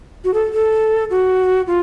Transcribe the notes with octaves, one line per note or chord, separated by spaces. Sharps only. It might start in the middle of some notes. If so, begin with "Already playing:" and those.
F#4
A4
A4
F#4
F4